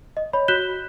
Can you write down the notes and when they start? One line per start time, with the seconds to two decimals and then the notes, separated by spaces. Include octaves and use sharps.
0.17 D#5
0.33 C#5 B5
0.48 F#4 F#6 G6 B6 E7 G7